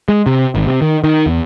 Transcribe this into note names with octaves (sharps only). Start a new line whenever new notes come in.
G#3
C3
G#1
C3
D#3
D#3
E2